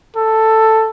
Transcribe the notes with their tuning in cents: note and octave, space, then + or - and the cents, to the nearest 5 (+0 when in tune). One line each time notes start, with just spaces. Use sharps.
A4 +5